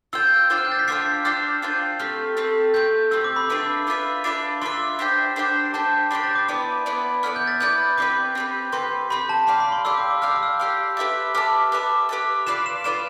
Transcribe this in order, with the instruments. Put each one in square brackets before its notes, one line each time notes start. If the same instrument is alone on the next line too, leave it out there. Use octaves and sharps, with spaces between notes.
[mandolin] F4 C5 G5 [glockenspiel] E6
[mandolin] D4 F4 C5 G5
[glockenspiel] F6
G6
A6
B6
[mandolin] D4 F4 C5 G5 [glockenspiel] C7
[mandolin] D4 F4 C5 G5 [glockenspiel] F6
[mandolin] D4 F4 C5 G5
[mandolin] A3 C4 G4 [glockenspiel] F6
[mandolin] A3 C4 G4
[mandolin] A3 C4 G4 [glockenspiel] G6
[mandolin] A3 C4 G4 [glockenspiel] E6
[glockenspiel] D6
B5
[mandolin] D4 F4 B4 E5 [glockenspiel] B5
[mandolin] D4 F4 B4 E5
D4 F4 B4 E5
[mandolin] D4 F4 B4 E5 [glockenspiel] C6
[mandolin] D4 G4 C5 G5
D4 G4 C5 G5
[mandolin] D4 G4 C5 G5 [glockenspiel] A5
[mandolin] D4 G4 C5 G5 [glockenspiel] B5
[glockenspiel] A6
D6
[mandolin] B3 E4 B4 D5 [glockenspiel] D6
[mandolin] B3 E4 B4 D5
[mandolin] B3 E4 B4 D5 [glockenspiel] F6
[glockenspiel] G6
A6
[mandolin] B3 E4 B4 D5 [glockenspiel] G6
[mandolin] C4 G4 B4 [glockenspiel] D6
[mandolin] C4 G4 B4
[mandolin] C4 G4 B4 [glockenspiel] C6
[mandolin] C4 G4 B4 [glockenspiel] B5
[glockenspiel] A5
[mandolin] G4 D5 F5 [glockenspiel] B5
[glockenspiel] B5
C6
[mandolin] G4 D5 F5 [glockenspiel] E6
[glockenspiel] D6
D6
[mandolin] G4 D5 F5 [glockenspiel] F6
[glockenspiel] E6
D6
E6
[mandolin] G4 D5 F5
G4 B4 E5 A5
[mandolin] G4 B4 E5 A5 [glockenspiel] F6
[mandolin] G4 B4 E5 A5
G4 B4 E5 A5
[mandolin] F4 B4 D5 F5 [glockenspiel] E7
[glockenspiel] E7
[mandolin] F4 B4 D5 F5 [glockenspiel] E7